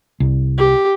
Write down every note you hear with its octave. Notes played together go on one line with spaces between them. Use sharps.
C2
G4